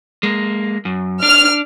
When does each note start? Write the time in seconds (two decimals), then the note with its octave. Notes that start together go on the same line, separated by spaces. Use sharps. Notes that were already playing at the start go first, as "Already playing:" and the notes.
0.23 G#3 A#3
0.85 F#2
1.23 D4 F6